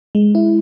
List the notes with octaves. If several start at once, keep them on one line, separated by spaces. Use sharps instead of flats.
G#3
E4